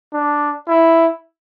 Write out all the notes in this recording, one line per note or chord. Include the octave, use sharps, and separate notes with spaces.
D4
E4